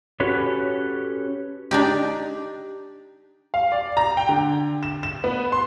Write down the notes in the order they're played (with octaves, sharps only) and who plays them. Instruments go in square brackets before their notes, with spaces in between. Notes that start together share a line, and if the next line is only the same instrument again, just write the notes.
[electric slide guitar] C#4 F#4 G4 A4 B4 C#5
[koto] D4 D#4 G4
[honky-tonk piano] F5
D5
A#5
G5
D3
E7
E7
B3
C6